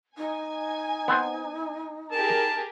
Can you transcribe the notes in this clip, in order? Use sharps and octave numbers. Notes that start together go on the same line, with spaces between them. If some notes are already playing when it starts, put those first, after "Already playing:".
D#4 G#5
B3 C4 C5
G4 G#4 A#4 A5